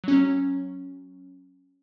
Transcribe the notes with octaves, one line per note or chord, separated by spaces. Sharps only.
F#3 C#4